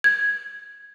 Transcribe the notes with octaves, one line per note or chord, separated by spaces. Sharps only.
G#6